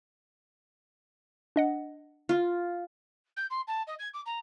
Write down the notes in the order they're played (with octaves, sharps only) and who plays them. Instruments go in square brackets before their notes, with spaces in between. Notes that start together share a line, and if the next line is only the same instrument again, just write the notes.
[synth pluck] D4 D#5 F#5
[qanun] F4
[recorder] G6
C6
A5
D#5
G#6
D6
A#5